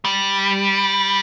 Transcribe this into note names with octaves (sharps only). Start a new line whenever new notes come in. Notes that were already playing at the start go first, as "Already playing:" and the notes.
G3